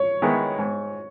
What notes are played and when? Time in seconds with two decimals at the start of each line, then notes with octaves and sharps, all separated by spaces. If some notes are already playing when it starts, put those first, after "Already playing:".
Already playing: C#5
0.22 D#3 G#3 B3 E4
0.59 G#2